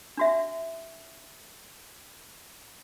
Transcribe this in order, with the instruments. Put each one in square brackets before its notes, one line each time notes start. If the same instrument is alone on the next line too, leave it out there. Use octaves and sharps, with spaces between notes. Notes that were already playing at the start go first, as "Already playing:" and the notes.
[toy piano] D4 F#4 E5